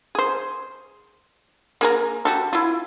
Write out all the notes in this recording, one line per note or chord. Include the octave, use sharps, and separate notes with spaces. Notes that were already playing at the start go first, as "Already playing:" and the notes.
G#4 C5
A#3 G#4 A#4
F#4 G4 A4
E4 F4